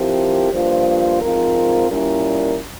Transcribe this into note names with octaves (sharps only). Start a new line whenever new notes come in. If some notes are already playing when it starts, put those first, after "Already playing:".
Already playing: F3 C4 E4 G4 A#4
G2 F3 A#3 F4 C5
G#2 F3 C4 F4 A#4
A#2 G3 C#4 E4 A#4